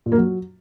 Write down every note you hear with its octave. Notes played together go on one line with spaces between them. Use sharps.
A#2
A#3
F#3